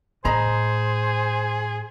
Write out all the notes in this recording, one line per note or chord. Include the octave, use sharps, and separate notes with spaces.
A2 G#4 C5 D#5 A#5 B5